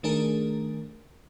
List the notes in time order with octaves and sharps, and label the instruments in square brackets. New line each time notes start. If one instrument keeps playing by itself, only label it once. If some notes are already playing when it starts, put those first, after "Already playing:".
[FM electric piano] D#3 A3 D4 G#4 A#4